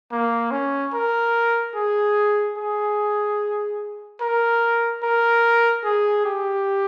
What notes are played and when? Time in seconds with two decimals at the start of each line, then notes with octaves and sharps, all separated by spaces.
0.11 A#3
0.51 C#4
0.93 A#4
1.75 G#4
2.57 G#4
4.21 A#4
5.03 A#4
5.84 G#4
6.25 G4